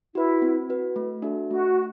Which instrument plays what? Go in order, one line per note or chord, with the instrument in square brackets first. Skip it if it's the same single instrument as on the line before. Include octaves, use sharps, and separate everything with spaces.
[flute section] E4 [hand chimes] F#4 B4
[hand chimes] C4
F#4 B4
A3
D4 F#4 A4 E5
[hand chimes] A3 [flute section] F#4